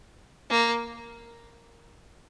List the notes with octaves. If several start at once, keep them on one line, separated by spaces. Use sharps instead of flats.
A#3